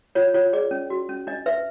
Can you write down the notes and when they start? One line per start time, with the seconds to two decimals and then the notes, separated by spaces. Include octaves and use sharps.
0.15 F4 C#5
0.34 F4 C#5
0.53 G#4 D5
0.71 C#4
0.90 F#4
1.09 C#4
1.27 D4 D#5
1.46 B4 E5